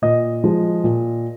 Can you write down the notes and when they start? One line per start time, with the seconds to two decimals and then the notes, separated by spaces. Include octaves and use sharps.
0.02 A#2 D#5
0.44 F3 G#3
0.84 A#2